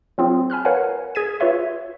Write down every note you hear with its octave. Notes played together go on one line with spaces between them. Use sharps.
F#3 C4 F4 G#4
G#5 B5 F6 F#6
A#4 B4 C#5 F5 F#5 G#5
G#4 G#6 B6 D#7
F4 B4 C#5 E5 C6